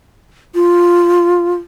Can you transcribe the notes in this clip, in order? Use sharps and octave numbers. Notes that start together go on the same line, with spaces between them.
F4